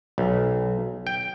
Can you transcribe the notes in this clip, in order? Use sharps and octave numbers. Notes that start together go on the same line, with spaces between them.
B1
G5